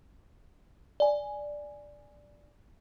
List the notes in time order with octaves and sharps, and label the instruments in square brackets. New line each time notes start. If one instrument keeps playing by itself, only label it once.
[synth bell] D5 G#5